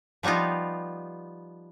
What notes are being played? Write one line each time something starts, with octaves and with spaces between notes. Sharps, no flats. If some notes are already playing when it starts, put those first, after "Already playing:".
F3 G3 B3 D#4 F4